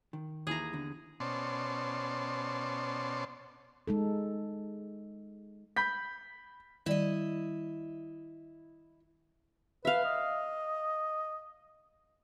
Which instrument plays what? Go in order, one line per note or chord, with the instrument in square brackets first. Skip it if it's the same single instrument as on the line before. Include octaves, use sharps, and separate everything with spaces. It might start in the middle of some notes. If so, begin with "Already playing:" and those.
[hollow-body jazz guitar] D#3
[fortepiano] D#2 E3 [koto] G#4 A#5
[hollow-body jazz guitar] E2 D3
[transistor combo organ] B2 C#4 C5 D5 A5 C6
[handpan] G#3 D#4 A4
[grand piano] B5 G6 B6
[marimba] D#3 G3 D5 [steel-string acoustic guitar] E4 D#5
[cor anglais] B4 [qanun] E5 F5
[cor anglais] D#5